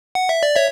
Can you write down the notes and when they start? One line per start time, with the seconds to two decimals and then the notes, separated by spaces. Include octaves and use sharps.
0.15 F#5
0.29 E5
0.43 D5
0.56 C#5 E5